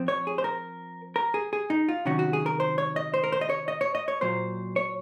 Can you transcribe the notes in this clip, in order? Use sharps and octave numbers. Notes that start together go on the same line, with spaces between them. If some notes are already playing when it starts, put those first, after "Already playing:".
Already playing: F3 C4
C#5
G#4
C5
A#4
A#4
G#4
G#4
D#4
F4
C3 D#3 F#3 C#4 F#4
F#4
G#4
A#4
C5
C#5
D#5
C5
A#4
C5
D#5
C#5
D#5
C#5
D#5
C#5
A#2 F#3 A#3 C5
C#5